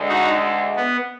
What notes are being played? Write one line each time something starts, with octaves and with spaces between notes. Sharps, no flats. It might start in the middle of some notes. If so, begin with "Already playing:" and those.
Already playing: D2 D3 G#3
D#4 F#4
B3